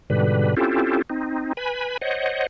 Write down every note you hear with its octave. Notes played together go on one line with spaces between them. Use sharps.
G#2 B2 D3 G3 B4
C4 C#4 E4 F4 G4 A4
C4 D#4
B4 G#5 B5
C5 C#5 D#5 F#5